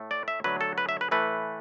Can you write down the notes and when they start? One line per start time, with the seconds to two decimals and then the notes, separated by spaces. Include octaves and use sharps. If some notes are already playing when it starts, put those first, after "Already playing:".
Already playing: A2 A3
0.11 D5
0.28 E5
0.44 D3 F#3 A3 B4
0.61 A4
0.78 B4
0.89 E5
1.01 B4
1.11 A2 E3 A3 B4